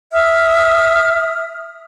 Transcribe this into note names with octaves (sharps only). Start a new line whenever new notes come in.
E5 D#6 F6